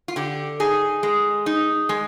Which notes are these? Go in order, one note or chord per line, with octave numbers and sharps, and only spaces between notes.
F4
D3 G4
D#4 G#4
G#3
D#4
G#3